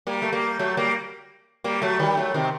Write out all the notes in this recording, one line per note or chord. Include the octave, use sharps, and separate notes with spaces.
G3 A#3
A3
G3 A#3
F#3 A3
G3 A#3
G3 A#3
F#3 A3
D#3 G3
F#3 A3
C3 D#3